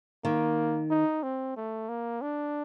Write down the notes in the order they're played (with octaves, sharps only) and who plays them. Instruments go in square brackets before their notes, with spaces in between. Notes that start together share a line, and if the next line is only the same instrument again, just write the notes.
[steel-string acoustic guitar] D#3 [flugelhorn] A#3
[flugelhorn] D#4
C4
A3
A#3
D4